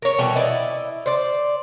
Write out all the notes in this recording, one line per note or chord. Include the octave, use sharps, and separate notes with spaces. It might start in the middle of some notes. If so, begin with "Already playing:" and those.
A#4 C#5
B2 E3 G3
E4 D5 D#5
C5 D5